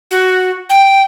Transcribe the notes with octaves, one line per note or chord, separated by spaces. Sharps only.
F#4
G5